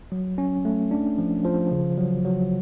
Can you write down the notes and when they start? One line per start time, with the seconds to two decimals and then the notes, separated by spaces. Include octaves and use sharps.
0.12 F#3
0.38 C#4
0.65 A3
0.91 D4
1.18 F3
1.45 F3
1.71 C#3
1.98 F#3
2.25 F#3